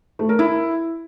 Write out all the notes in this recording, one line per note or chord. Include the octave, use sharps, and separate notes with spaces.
A3
A#4
E4